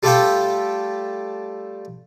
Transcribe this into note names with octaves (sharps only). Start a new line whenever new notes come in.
G3 A3 F4 G4 A4 G5